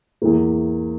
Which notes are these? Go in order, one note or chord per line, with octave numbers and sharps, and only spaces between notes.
E2 E3 A#3